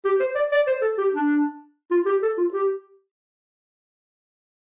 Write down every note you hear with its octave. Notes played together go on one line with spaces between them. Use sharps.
G4
C5
D5
D5
C5
A4
G4
D4
F4
G4
A4
F4
G4